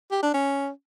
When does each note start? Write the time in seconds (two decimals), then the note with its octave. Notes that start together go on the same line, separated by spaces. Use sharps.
0.11 G4
0.23 D4
0.34 C#4